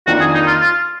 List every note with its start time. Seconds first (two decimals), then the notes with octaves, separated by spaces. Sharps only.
0.07 F2 D#3 A#3 D4 F4 F#4
0.20 G#4
0.35 D#4
0.47 F4
0.61 F4